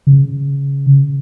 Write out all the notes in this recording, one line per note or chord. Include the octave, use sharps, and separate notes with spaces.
C#3